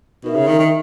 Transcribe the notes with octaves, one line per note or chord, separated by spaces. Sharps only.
B2 D#4 A#4 E5
C#3
D#3
D#3